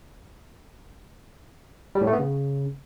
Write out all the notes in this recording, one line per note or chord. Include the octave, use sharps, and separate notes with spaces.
G3
A2
A3
B3
C#3